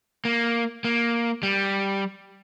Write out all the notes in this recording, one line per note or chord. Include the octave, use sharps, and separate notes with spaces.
A#3
A#3
G3